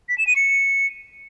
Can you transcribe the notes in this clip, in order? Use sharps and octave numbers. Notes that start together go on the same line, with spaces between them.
B6
E7
D#7
C#7